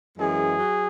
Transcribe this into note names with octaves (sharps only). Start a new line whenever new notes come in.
F#2 E3 G#3 G#4
F#3